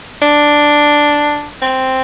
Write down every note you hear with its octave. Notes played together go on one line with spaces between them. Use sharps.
D4
C4